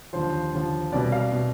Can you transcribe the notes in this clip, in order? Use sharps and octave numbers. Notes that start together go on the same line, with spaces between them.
D#2 D3 F3 C5
D#2 D3 F3
C2 B2 D5
F5
B2